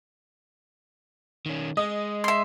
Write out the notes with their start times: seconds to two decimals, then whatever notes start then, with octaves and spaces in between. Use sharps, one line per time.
1.46 D#3 C#4
1.77 G#3 D#5
2.24 E5 C6